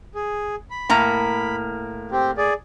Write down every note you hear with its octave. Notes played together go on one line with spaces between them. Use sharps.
G#4
B5
A2 A#3 A#5
C4 G4
G#4 D5